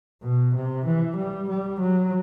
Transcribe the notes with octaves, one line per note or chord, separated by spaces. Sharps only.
B2
C3
E3
G3
G3
F#3